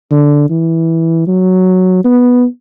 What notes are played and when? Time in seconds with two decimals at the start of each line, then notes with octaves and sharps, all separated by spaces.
0.11 D3
0.50 E3
1.27 F#3
2.05 B3